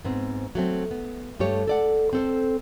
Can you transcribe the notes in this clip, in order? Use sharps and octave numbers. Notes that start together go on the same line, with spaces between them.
G#2 B3 C4
F#3 A3 C4
B3
G2 A3 G4 C#5
A4 D5 F#5
C4 A4 C5